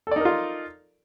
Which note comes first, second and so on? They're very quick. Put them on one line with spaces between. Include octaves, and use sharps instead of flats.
A4 D5 D#4 A#4 F4